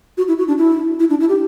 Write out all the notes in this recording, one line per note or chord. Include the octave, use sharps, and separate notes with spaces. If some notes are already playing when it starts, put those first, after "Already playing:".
F#4
E4
F#4
D4
E4
E4
D4
E4
G4